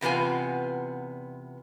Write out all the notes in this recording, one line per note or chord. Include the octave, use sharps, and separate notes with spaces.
E2 C3 B3 F4 G#5